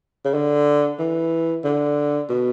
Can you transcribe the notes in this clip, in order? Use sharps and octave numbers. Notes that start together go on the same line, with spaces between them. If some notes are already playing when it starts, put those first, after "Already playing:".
C#3
D3
E3
D3
B2